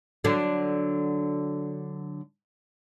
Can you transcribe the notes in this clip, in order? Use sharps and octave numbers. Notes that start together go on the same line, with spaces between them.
D3 F#3